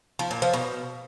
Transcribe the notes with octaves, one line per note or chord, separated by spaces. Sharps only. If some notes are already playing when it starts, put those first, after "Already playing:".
F3
A#2
F3
B2